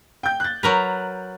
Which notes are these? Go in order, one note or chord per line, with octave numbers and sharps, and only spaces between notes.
G5 G6
F#6 A6
F#3 A#4 B4 F#6 F7